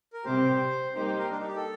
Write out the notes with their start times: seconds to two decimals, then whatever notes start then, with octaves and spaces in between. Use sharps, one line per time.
0.13 A#4
0.25 C3 G3 C4 G4 C5
0.95 G3 A#3 D#4 G4 C5
1.07 C5
1.18 A#4
1.30 D4
1.39 D#4
1.48 G4
1.56 A4